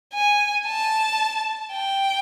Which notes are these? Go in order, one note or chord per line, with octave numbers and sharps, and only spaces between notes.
G#5
A5
G5